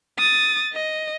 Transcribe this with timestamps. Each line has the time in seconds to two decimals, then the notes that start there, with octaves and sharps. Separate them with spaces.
0.19 D#6 A6
0.73 D#5